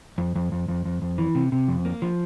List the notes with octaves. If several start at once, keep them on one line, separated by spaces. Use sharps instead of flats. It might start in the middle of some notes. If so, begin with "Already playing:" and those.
F2
F2
F2
F2
F2
F2
E3
C3
C3
F2
A#3
F3